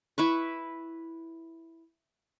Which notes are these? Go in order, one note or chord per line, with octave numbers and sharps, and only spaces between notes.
E4 B4 C#6